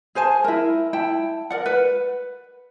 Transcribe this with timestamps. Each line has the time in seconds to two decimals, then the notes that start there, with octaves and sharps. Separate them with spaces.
0.15 G#4 C5 G#5 A5
0.44 E4 A#4
0.93 E4 G5 A5
1.50 A#4 D5 F#5
1.66 B4